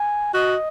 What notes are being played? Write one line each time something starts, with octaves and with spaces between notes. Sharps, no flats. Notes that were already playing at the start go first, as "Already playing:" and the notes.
Already playing: G#5
F#4 D#5